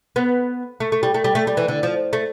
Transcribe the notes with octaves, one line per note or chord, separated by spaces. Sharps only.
B3
A3
A3
G3
A3
G3
A3
G3
E3
D3
F3
A3